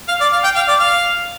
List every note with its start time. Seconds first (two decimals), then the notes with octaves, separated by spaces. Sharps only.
0.08 F5
0.21 D5
0.32 F5
0.44 G5
0.56 F5
0.68 D5
0.80 F5